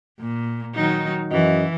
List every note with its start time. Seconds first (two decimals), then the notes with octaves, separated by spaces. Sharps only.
0.20 A#2
0.74 D#3 F#3 D#4
1.31 F#2 E3 F#4 D#5